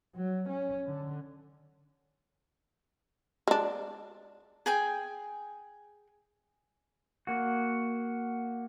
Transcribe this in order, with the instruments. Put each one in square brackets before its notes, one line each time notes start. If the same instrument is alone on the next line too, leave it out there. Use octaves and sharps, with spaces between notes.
[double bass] F#3
C#4
D3
[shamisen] G#3 D4
[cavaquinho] G#4 G5 G#5
[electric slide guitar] A#3 F#4